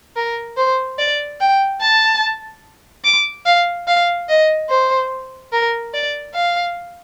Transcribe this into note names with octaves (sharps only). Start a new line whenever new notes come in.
A#4
C5
D5
G5
A5
D6
F5
F5
D#5
C5
A#4
D5
F5